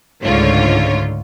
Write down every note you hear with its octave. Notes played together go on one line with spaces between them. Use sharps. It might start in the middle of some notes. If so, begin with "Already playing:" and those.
C#2 G#2 D3 A3 F4 C#5